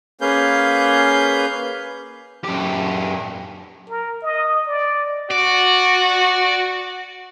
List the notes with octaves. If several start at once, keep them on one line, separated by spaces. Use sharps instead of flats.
A#3 C#4 G#4 B4 F5 G6
F#2 G4
A#4
D#5
D5
F#4 D5